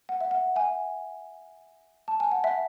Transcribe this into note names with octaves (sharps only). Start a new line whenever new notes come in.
F#5
E5
F#5
E5 G#5
A5
G#5
F#5
E5